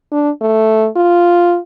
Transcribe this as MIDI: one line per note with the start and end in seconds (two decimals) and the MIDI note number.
0.12 0.30 62
0.41 0.87 57
0.96 1.58 65